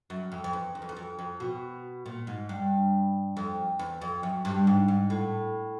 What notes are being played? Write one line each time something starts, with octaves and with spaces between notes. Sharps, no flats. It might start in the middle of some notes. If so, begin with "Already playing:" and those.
F#2
F2
F2
E2
E2
F2
E2
F2
F2
B2
A#2
G#2
G2
F2
E2
F2
F#2
G2
G#2
G#2
A2